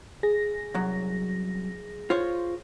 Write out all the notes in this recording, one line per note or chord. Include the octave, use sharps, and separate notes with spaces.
G#4 A#6
C2 F#2 F#3
F4 C5 C#5